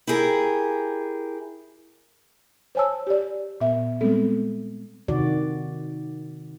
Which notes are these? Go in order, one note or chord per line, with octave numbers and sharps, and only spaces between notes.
E4 G4 G#4 A#4
C5 C#5 G#5 A5 E6
G4 D5
A#2 B3 E5
G3 G#3 B3 C4 A4
C3 D#3 F#4 D5